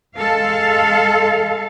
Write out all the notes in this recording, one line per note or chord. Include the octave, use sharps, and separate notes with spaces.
G#3 A4 F5